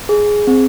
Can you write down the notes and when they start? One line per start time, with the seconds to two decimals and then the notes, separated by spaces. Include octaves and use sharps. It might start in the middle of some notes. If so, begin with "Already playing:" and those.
0.09 G#4
0.47 C4